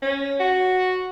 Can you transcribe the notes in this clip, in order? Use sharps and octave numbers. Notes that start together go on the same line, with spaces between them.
C#4
F#4